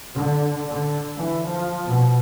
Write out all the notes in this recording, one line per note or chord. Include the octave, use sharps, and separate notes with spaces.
D3
D3
E3
F3
B2